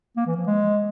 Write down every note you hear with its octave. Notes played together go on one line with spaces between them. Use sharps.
A#3
E3
F3
G#3